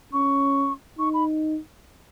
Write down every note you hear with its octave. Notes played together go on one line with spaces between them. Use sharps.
C#4 C#6
D#4 C#6
B5